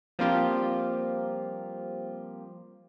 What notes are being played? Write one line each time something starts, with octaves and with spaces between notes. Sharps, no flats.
F3 G3 A#3 C4 F4 G4